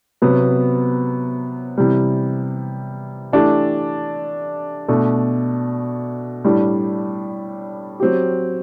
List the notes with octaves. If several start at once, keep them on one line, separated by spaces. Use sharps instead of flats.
C3 F#3 B3
C3 E3 G3
E3 A3 D4 G4
B2 A3 D4
A2 G3 D4
F#3 C4 G4